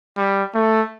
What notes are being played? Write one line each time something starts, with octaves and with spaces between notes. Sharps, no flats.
G3
A3